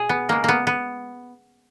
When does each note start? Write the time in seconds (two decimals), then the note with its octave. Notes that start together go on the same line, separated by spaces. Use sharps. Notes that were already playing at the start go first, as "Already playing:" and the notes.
Already playing: B2 G#4
0.09 B3
0.29 C#3 G#3 A#3
0.44 A#3 B3
0.67 B3